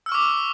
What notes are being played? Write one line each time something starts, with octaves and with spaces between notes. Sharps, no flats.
C#6 D6 E6 F6